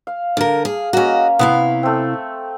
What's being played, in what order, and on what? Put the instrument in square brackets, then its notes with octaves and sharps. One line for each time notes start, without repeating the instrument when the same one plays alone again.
[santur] F5
[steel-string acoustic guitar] D3 A#4 [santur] F5
[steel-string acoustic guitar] G#4
[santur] A#3 C#4 [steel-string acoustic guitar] F#4 D#5
[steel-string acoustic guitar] C3 E4 F5 [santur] B3
[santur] A3 C4